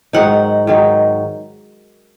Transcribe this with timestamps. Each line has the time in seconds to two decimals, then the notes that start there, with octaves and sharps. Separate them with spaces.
0.13 G#2 D#3 F#3 D#4 F#5
0.67 G#2 D#3 F#3 D#4